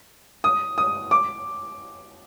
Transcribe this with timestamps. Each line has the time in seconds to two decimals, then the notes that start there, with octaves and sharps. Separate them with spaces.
0.44 D#6
0.78 D#6
1.11 D6